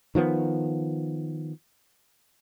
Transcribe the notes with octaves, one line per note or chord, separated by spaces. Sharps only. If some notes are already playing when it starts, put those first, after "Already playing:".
D#3 F3 G#3 B3